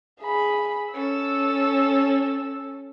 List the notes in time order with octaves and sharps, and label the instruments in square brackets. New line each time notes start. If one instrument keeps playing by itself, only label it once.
[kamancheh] G#4 B5
[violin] C#4 A4 [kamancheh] E6